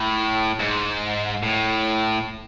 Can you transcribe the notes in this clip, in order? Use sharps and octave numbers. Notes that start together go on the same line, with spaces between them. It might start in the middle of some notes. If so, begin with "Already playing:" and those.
Already playing: A2
G#2
A2